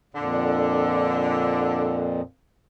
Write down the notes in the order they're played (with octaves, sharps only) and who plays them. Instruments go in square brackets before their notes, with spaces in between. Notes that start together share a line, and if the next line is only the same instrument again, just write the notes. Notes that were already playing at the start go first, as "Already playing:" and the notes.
[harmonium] F2 A#2 [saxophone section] D3